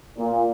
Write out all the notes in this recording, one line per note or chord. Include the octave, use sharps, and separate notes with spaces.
A#2